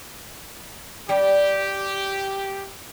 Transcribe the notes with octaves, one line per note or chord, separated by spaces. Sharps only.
G3 G4